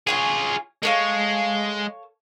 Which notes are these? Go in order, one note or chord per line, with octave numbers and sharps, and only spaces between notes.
F4 G#4 C#5 G5 G#5
G#3 A4 C#5 F5